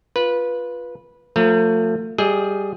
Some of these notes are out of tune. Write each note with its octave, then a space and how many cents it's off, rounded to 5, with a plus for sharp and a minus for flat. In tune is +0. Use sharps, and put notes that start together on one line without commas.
F4 +0 B4 -15
F3 +30 A3 +35 A#5 +0
G3 +0 G#4 +0 D#5 +30